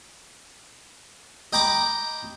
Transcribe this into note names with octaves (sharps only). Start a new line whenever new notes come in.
D#5 G5 A#5 B5 D6